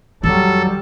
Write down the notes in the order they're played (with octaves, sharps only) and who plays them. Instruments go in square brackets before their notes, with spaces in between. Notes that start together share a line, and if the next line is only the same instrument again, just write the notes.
[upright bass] F2 D#3 [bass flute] F#3 [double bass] G3 [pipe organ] A4